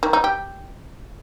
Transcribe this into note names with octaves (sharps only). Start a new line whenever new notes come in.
D#3
D#4
G4